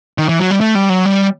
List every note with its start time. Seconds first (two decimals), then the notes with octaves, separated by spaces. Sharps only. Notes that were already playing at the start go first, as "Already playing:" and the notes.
0.18 D#3
0.29 E3
0.40 F#3
0.51 G3
0.61 A3
0.75 G3
0.90 F#3
1.05 G3